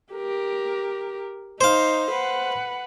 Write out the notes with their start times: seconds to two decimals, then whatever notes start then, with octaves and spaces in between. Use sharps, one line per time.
0.13 G4 A#4
1.61 D#4 C5 F5
2.11 B4 F#5